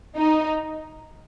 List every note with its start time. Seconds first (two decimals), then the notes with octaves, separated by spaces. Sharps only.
0.18 D#4